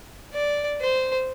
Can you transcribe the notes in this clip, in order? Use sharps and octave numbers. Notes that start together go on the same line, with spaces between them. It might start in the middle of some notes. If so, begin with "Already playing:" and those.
D5
C5